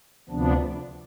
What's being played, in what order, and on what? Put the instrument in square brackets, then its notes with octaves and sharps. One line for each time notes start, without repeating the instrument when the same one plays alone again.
[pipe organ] D2 C3 F3 B3 D4